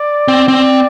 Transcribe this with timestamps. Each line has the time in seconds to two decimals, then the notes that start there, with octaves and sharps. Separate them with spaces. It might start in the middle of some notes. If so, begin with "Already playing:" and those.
Already playing: D5
0.28 C4
0.48 C4 D5